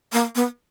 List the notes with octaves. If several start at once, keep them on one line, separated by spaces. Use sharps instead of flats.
A#3
B3